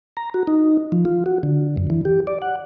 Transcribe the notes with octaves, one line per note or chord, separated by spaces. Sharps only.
A#5
F#4
D#4
F3
F4
F#4
D3
F#2
E3
G4
D5
F#5